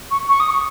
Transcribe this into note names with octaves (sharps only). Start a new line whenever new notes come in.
C#6
C#6
D#6
C#6